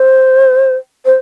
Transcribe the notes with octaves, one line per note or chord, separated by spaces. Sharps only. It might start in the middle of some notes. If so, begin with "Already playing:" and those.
Already playing: C5
C5